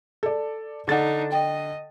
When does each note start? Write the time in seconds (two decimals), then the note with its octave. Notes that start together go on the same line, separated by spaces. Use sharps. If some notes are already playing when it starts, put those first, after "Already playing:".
0.23 A4 D5
0.88 D3 D4 D#4 A4 F#5 A6
1.32 D#5 G5